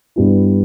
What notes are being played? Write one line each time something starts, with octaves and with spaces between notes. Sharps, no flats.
G2 G3 B3 E4